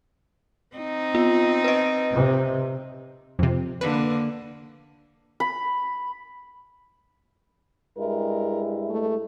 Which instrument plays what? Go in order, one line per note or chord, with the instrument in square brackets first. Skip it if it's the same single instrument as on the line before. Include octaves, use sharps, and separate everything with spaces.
[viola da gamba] C4 D#4
[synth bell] B3 F4
B4 D#5
[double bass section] C3
[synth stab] F2 C3
[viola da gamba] D3 A#3 [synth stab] B4
[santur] B5
[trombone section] G2 G#3 E4 [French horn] A#4
[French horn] A3